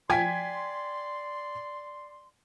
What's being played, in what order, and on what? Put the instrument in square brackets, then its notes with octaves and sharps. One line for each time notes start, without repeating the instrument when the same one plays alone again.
[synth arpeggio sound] F3 [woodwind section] D5 C6 [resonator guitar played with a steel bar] G5 G#5 [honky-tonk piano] G#6 B6